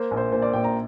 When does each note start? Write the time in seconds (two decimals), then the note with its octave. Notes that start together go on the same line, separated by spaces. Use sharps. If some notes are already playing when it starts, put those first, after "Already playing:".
Already playing: A#3 C5
0.11 A#1
0.17 C5
0.32 A#2 C5
0.42 D5
0.53 A#1 G5
0.64 A#5